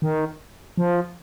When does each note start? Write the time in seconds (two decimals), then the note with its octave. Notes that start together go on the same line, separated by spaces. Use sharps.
0.02 D#3
0.77 F3